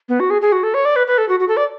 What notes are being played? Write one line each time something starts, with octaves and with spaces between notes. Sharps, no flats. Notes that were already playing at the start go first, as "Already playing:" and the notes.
B3
F#4
G#4
G#4
F#4
A4
C#5
D5
B4
B4
A4
F#4
F#4
A4
D5